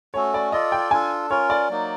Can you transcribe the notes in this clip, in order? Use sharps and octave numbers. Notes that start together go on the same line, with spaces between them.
A3 C#4 F#4 A4 C#5
D5
F4 A4 D5 D#5
G5
D4 F4 A4 G#5
C#4 F4 A#4 C#5
D5
F#3 A#3 D#4